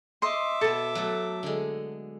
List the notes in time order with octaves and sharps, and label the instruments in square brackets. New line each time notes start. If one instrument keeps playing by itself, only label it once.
[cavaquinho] D#5 C6 [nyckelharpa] E5 D6
[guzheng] B2 B3 [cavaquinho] A4
[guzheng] F#3 A3
D3 G#3